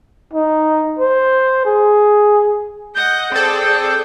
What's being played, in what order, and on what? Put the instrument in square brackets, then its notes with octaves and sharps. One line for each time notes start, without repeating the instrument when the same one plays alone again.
[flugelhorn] D#4
C5
G#4
[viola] D#5 F#5 [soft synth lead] G6
[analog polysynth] C4 A4 [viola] G#4 D5